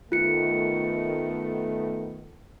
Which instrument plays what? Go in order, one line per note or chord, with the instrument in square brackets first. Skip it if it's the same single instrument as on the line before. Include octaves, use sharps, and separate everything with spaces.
[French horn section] D#3 A3 B3 [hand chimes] F4 C#7